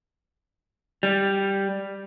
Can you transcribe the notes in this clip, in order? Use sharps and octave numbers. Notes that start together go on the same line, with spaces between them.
G3